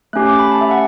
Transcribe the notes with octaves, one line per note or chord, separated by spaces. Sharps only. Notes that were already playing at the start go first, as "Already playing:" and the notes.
A3 C#4 G4 F#6
D6
B5
A5
E5
F#5